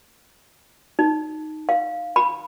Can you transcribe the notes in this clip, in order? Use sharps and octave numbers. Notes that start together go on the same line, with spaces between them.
D#4
F5
B5